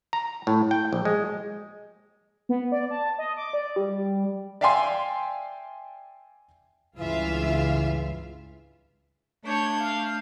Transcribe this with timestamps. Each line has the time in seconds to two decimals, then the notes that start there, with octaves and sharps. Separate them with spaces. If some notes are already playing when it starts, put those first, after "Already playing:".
0.13 A#5
0.47 A2
0.71 G5
0.93 A#1
1.05 G#3
2.49 B3
2.72 D5
2.91 A5
3.18 D#5
3.37 D6
3.53 D5
3.76 G3
4.61 D5 E5 F5 G5 G#5 C6
6.99 C#2 G2 E3 F4 E5 F5
9.44 A3 D4 C#5 G6
9.79 F5